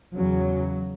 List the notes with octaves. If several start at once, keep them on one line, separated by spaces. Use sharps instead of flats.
E2 C#3 F#3